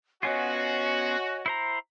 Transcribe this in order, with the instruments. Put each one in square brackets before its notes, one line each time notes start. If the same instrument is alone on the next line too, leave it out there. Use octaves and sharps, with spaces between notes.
[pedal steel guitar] B3 C#4 F4 [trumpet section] F#4 [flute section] C#5 D#5 G#5
[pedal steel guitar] E4 C5 A#5